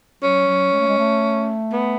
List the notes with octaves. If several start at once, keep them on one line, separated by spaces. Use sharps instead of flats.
F#3 C#4
F#3
G#3
A3
G#3
A3
B3